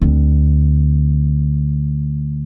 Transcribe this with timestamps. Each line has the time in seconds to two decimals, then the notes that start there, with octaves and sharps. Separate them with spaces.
0.01 D2 C4